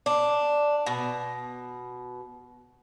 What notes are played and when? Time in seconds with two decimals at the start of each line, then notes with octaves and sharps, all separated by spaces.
0.06 D4
0.86 B2